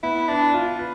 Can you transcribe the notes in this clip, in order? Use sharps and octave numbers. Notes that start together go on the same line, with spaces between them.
B3 E4
D4 B4
F4
B4